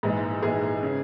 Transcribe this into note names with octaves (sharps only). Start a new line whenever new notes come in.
A#1 G#2 E3 G#3
A#1 G#2 E3 G#3 G#4
C#3